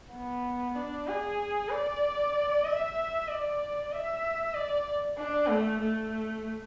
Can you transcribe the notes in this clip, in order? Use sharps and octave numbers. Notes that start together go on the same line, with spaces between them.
B3
D4
G#4
D5
E5
D5
E5
D5
D4
A3
A3